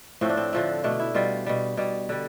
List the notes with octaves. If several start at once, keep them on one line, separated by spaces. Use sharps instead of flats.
A2 F3 A3 C4
D4
C4
D3 F3 A3
B2 A3 D4
E4
B2 G3 F4
B2 G3
B2 G3
D3 G3